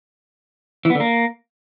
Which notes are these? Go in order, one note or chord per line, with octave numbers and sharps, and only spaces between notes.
E3
B3
D3
A#3